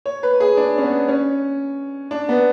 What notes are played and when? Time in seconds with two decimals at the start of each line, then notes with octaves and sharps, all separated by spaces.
0.06 C#5
0.23 B4
0.40 G#4
0.57 D4
0.78 C#4
0.83 B3
1.08 C#4
2.11 D4
2.29 B3